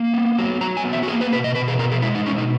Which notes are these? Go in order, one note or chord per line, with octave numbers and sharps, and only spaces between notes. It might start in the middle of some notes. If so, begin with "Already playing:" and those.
Already playing: A#3
B3
F#3
F#3 A#5
G#5
B3
E5
F#4
A#3 G#4
B4
B2 B4
D#5
B2 B4
G#4
B2 A#4
G#4
G#3 E4
D#4
B2 C#4
D#4